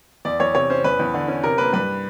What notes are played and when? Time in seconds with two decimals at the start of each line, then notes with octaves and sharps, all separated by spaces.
0.25 E2 D5
0.40 E2 C#5
0.55 C3 C#5
0.70 C#4 C5
0.84 E2 B4
0.99 E2
1.14 D3
1.28 C#4
1.44 C3 A#4
1.58 A#3 B4
1.73 G2 B4